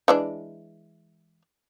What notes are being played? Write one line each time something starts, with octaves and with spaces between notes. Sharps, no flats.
E3 G#3 D4